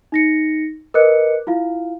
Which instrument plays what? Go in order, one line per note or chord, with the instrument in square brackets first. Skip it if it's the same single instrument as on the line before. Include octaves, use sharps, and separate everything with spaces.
[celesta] D#4 A#6 C#7
A#4 B4 D#5 D6 F#6 C#7
E4 F4 F5